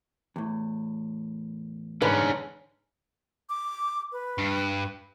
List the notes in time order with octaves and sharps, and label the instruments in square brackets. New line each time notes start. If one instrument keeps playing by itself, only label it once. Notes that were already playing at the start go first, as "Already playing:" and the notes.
[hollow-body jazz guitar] E2 A2
[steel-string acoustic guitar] G#2 [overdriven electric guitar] D3 C#4 [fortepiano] B4
[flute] D6
B4
[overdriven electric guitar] G2